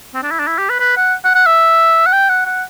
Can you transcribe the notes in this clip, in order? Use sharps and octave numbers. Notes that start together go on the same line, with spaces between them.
C4
D4
E4
D4
E4
G4
B4
B4
F#5
F#5
F#5
E5
F#5
G5
F#5
F#5